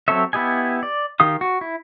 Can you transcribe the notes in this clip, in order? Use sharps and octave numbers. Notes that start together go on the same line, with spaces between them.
F#3 C4 A4 C#5 E5
B3 E4 G4 D#5 G#5
D5
D#3 G4 F5 D#6
F#4
E4